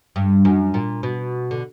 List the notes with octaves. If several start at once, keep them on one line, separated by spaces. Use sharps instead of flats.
G2
F#2
A#2
B2
D3